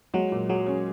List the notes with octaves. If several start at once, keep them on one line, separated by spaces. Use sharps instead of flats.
F#3 G#3
A#2
F#3 G#4
C#4